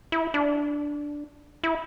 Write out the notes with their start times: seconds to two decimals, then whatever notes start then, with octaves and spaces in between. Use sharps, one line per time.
0.12 E4
0.34 D4
1.64 E4